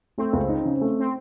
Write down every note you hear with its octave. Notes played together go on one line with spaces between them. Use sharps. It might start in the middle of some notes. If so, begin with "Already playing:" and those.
A3 C4
C#2
D#4
C#3
A3
C4